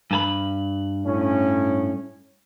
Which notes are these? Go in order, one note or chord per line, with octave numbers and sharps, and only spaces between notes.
G2 A4 B5
A2 C#4